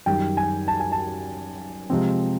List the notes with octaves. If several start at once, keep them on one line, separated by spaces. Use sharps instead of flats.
F#2 D#3 G3 G5
G#5
A5
G#5
A5
C3 F3 G#3 C4